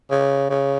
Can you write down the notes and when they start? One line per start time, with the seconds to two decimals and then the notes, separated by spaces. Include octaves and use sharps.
0.11 C#3
0.50 C#3